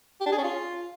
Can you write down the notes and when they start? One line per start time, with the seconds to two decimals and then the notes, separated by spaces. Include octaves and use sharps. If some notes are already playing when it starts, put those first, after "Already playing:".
0.21 G4
0.26 D4
0.32 G#4
0.38 C#4
0.44 F4